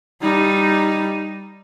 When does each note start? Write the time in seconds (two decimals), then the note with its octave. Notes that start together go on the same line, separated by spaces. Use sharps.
0.22 G3 D#4